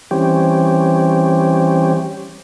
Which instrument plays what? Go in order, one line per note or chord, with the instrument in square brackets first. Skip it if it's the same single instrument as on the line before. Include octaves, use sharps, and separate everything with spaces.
[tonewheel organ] E3 G3 C4 C#4 G4